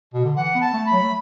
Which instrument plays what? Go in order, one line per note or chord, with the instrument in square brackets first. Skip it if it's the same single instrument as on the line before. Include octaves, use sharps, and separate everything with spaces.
[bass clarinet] B2
D3
[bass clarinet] E3 [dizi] F#5
[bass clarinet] B3
[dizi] A5
[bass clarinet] A3
[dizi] B5
[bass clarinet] F#3
A3